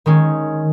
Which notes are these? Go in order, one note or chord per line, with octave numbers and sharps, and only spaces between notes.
D#3 G#3 C#4